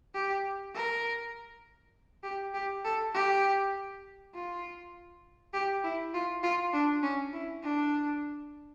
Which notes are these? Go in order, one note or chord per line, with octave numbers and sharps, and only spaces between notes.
G4
A#4
G4
G4
A4
G4
F4
G4
E4
F4
F4
D4
C#4
E4
D4